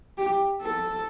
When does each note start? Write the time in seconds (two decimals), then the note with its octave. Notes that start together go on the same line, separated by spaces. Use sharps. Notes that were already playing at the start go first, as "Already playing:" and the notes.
0.18 G4
0.62 A4